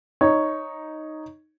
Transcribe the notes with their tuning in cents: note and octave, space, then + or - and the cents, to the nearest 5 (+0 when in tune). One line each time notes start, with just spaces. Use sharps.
D#4 +0 C#5 +0